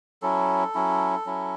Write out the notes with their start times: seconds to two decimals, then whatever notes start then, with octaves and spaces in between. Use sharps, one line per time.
0.22 F#3 C#4 E4 A4
0.75 F#3 C#4 E4
1.26 F#3 C#4 E4